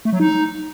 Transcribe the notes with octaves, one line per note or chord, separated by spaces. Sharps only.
A3
F#3
D#4